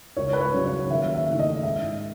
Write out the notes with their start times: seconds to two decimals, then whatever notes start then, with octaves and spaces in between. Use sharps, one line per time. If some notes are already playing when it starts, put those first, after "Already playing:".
0.17 C#2 C#5
0.33 B4
0.41 C#5
0.53 C#3 F#3 C#4
0.65 C#5
0.90 D#2 E5
1.15 E5
1.27 C#3 E3 A3 D#4
1.39 D#5
1.63 G#2 E5